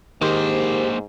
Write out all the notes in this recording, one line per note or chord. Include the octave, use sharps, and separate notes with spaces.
G#2 D#3 A#3 G4 C5